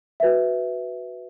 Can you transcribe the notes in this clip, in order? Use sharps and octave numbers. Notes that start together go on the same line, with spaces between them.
F#4 B4 E5